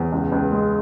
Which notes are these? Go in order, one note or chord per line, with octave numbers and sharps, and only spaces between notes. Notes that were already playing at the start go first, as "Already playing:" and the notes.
Already playing: E2
C#2
C#2
G#3